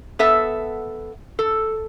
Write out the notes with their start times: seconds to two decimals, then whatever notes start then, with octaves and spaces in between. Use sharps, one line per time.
0.19 B3 A4 E5
1.39 A4